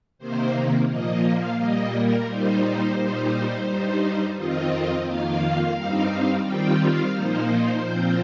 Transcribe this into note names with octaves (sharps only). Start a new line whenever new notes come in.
C3 D#3 A#3 C5
A#2 F3 A#3 D#5
F5
A#2 G3 A#3 D#5
A#4
A#2 G3 D#4 C5
C5
A#2 G3 D#4
G2 G3 D#4
F2 D#3 C4 F4 D#5
F2 D#3 A#3 F4 F5
G2 G3 C4 D#4
D#3 G3 C4 F4 G5
F5
A#2 F3 A#3 D#4 C5
C5
A#2 F3 C4 F4